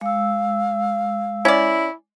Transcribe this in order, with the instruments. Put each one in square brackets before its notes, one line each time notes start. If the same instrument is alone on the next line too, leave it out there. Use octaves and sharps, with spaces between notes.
[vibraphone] G#3 E6 [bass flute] F5
[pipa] C#4 D5 [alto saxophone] E4